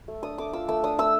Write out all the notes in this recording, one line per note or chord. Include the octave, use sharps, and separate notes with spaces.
A3
D4 D#6
A3 D6
F4 E6
A3 E6
D4 D#6
A3 E6